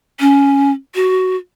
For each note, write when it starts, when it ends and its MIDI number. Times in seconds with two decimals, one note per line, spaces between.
0.20 0.72 61
0.95 1.36 66